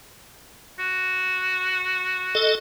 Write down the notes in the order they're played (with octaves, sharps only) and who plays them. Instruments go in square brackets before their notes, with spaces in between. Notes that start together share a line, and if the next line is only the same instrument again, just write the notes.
[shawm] F#4
[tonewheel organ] A4 D#5